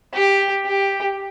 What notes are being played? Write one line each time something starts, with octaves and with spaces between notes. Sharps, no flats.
G4
G4